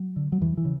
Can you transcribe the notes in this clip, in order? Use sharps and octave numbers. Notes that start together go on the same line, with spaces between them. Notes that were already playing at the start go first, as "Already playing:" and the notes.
Already playing: F#3
D3
F#3
E2 E3
E3
C#3